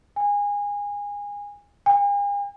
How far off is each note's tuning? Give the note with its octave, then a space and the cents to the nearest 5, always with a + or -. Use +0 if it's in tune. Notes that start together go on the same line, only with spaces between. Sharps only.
G#5 -25
G#5 -45